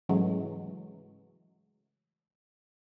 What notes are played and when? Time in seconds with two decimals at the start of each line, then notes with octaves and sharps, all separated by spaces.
0.09 G#2 C#3 E3 F#3 G#3 A3